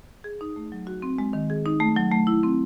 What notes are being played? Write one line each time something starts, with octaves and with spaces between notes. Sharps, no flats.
G#4
D#4
A3
F#3
F#4
C4
G#3
D#3
G#4
D#4
A3
F#3
A3
E4
C4